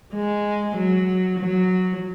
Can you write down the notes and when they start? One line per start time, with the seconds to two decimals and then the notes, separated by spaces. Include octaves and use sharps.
0.13 G#3
0.76 F#3
1.39 F#3